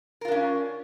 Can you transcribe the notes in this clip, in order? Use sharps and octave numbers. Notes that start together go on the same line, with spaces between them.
C#4 D4 F4 A#4